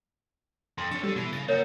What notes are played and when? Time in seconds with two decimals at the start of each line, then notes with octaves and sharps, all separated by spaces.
0.78 F2 C6
0.91 D4 C#5 C#6
1.03 G3 D4 A4
1.16 B2 E3 C7
1.33 C#3 A6 A#6
1.49 A#3 F#4 A#4 C#5